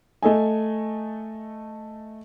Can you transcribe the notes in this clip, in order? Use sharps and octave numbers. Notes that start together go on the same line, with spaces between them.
A3 A4 D#5 G#5